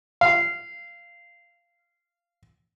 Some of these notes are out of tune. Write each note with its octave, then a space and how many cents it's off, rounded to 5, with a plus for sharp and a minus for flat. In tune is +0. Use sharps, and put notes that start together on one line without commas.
F5 -15